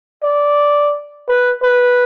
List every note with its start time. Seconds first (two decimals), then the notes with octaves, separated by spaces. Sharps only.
0.23 D5
1.28 B4
1.63 B4